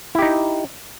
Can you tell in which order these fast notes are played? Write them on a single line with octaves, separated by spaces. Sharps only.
E4 G4 D#4